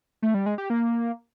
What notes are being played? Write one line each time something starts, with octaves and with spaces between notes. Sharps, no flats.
A3
G3
G#3
G4
A#3